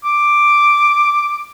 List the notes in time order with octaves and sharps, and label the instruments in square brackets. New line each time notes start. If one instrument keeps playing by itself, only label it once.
[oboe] D6